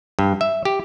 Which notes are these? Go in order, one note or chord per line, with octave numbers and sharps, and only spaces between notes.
G2
E5
G4